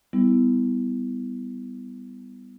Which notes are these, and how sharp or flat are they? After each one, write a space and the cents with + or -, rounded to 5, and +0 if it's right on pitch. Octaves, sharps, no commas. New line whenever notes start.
G3 +0 B3 +15 E4 -10